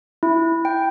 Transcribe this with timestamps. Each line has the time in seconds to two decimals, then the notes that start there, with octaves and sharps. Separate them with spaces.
0.23 E4
0.65 G5